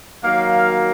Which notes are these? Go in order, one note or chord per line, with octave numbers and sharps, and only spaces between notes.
D#3 F#3 A#3 F5